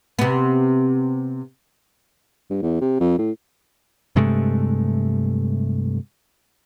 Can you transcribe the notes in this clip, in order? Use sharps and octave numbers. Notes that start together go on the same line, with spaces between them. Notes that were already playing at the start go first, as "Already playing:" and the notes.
C3 B3
G2
E2
C3
F2
A2
G2 C3 G#3 A3